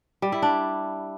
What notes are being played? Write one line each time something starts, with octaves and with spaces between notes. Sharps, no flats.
G3
E4
D4